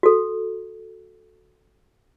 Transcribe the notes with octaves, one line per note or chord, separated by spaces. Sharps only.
F#4 A4